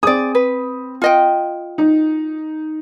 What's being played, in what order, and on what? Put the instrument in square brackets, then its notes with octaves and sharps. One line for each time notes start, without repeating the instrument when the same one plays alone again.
[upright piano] C4 D#6 [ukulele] G#4 D5
[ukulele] B4
F4 D#5 G5
[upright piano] D#4